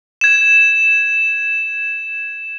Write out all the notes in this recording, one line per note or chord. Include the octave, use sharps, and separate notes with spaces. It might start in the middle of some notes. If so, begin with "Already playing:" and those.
G#6 E7